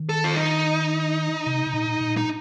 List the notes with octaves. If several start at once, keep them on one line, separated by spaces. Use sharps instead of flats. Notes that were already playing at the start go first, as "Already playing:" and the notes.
Already playing: D#3
A4
F4
D#4
C3
C3
A#2
A#2
D#4